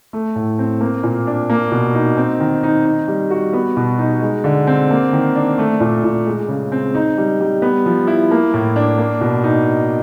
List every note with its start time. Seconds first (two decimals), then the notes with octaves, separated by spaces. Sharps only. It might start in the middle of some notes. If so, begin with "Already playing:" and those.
0.13 A3
0.35 A2
0.59 C4
0.81 A#3
1.03 A#2
1.27 D4
1.50 A#3
1.71 B2
1.94 D#4
2.17 C4
2.40 D#3
2.63 D#4
2.85 D#4
3.08 G3
3.30 F#4
3.53 B3
3.77 B2
3.99 D#4
4.21 G#3
4.44 D3
4.67 C4
4.91 A#3
5.13 D#3
5.35 D4
5.58 A3
5.80 A#2
6.04 A#2
6.26 G#3
6.48 C#3
6.72 C4
6.95 D#4
7.18 G3
7.40 G3
7.62 B3
7.86 F3
8.07 E4
8.31 A#3
8.54 A2
8.76 D4
8.98 A#3
9.21 B2
9.44 D#4